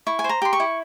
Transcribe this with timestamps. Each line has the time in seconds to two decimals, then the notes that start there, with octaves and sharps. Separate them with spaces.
0.07 E4 C#6
0.19 G#5
0.24 C5
0.29 A#5
0.42 G4 C6
0.53 C#6
0.60 E4